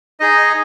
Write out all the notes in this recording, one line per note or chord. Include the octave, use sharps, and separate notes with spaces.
D#4 G#4 D#5